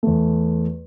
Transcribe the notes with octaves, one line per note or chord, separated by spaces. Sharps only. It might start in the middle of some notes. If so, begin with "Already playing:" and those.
E2 A3